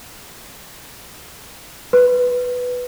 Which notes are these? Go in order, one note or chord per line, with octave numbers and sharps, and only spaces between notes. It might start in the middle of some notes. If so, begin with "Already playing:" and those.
B4